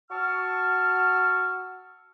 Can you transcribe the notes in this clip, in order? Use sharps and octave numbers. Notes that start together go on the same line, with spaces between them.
F#4 A5 C#6 E6 F6